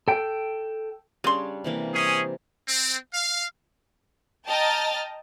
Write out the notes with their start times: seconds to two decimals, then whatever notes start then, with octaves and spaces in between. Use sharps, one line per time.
0.08 A4 G5
1.24 C#3 G3 D4 C#5 C6
1.64 C3 E3 A#3
1.94 C#4 G#4 C5
2.67 C4
3.13 F5
4.48 D#5 G5 A5 A#5 F6 A6